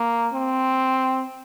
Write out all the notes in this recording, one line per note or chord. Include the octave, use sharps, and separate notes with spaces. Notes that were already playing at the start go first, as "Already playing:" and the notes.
Already playing: A#3
C4